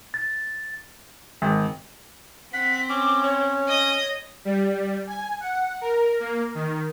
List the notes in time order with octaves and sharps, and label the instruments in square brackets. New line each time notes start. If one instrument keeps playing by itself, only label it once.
[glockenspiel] A6
[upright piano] G#1
[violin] C4 [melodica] F#5 [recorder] B6
[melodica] C#4 [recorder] D6
[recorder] C#5
[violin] D#5 D#6
[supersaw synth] G3
G#5
F#5
A#4
A#3
D#3